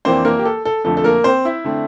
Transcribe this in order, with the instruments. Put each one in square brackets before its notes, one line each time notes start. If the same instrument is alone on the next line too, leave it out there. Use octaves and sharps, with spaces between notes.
[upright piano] F2 E3 A#3 C4 D4 C5
A#3 A#4
G4
A4
A4
F2 D3 F3 A3 A4
A4
A#3 A#4
C4 C5
E4 E5
D3 A3 C4